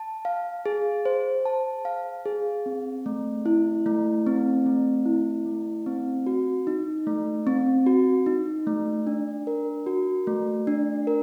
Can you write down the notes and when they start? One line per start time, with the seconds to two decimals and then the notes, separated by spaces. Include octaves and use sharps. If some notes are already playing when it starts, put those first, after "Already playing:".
Already playing: A5
0.25 F5
0.66 G#4
1.05 C5
1.45 A5
1.85 F5
2.26 G#4
2.66 C4
3.06 A3
3.46 E4
3.86 A3
4.27 C4
4.66 A3
5.06 E4
5.46 A3
5.86 C4
6.26 F#4
6.67 D#4
7.07 A3
7.47 C4
7.87 F#4
8.26 D#4
8.67 A3
9.07 D4
9.47 A#4
9.86 F#4
10.27 A3
10.67 D4
11.07 A#4